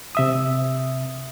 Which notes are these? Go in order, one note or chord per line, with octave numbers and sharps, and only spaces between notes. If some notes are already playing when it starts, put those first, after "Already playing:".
C3 E5 D#6